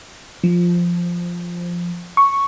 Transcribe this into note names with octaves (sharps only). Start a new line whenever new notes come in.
F3
C#6